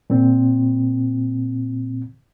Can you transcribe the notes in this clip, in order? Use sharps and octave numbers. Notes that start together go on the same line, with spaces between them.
A#2 C4